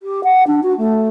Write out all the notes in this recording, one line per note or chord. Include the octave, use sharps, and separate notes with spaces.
G4
F#5
D4
F#4
A3